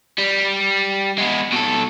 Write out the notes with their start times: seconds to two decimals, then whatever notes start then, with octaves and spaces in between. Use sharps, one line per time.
0.18 G3
1.18 G#3 B3
1.52 B2 A4